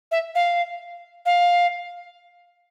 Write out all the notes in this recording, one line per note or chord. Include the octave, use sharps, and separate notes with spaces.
E5
F5
F5